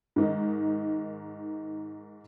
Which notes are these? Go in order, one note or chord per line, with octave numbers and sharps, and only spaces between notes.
G#2 D#3 D#4